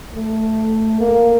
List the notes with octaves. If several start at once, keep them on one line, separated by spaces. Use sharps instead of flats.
A3
A#3